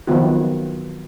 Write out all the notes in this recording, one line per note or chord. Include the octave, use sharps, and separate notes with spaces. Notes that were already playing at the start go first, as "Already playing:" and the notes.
D#3 F3 F#3 B3 F4 F#4